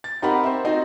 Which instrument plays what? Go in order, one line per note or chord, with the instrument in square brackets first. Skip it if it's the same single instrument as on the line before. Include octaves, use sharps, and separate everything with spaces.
[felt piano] A6
C4 D#4 G4 A#4 F#5 B5
C5 E5
C4 D#4 F#4 D#5